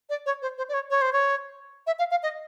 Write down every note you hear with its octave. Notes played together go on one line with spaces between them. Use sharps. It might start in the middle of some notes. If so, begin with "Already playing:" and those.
D5
C#5
C5
C5
D5
C#5
C#5
C5
C#5
E5
F5
F5
D#5